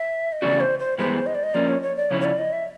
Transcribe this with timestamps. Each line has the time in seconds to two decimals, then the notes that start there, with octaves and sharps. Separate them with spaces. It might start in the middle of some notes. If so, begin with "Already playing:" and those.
Already playing: E5
0.32 D#5
0.42 C#3 E3 A3 C#4 F#4 D5
0.60 C5
0.79 C5
0.98 G2 E3 G#3 B3 C5
1.26 D#5
1.35 D5
1.43 D#5
1.54 F3 A#3 C#4 D5
1.69 C#5
1.82 C#5
1.97 D5
2.11 C#3 F3 C#4 E4 C#5
2.21 C#5
2.25 D5
2.39 D#5
2.52 E5